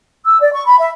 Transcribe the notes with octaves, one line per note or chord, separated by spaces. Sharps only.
E6
D5
C#6
B5
E5